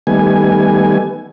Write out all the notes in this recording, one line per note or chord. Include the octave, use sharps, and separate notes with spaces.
D#3 G3 A3 B3 G#5